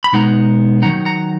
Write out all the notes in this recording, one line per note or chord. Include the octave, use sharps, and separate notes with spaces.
B5
B2 G#3 B3 D#4 F#5 A#5
D#3 F#3 B3 D#4 F#5 A#5
F#5 A#5